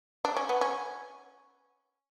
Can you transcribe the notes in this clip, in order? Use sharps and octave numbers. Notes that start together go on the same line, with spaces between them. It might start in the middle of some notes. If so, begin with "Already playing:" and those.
D4
C#4
B3
C#4